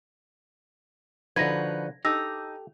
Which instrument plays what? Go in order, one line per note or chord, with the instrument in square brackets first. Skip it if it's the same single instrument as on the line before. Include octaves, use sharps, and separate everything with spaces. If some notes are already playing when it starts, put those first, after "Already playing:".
[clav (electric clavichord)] D3 F3 [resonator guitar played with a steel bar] D#4 F#4 B4 [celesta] G#6 A#6
[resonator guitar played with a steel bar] D#4 [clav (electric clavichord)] G4 A4 [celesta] E6 A#6